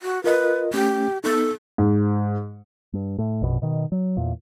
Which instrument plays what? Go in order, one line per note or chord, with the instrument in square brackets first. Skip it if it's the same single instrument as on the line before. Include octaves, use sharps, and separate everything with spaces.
[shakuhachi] F#4
[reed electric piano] F4 A#4 D#5 [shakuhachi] B4
[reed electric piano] A3 C#4 [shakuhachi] G4
[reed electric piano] B3 D#4 [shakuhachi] A4
[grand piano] G#2
[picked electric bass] G2
A2
A#1 F#2 B2
B2 D#3
F#3
E2 A#2